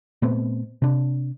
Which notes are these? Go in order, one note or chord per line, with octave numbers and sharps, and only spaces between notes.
A#2 A3 B3 C4
C3 D4